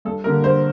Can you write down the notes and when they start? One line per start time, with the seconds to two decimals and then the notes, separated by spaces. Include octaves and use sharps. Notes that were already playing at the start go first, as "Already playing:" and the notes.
0.05 G2 A4
0.24 D3 G3 A#3 A#4
0.44 G2 C5